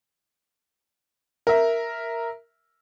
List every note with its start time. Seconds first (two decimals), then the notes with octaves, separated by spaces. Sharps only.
1.47 A#4 E5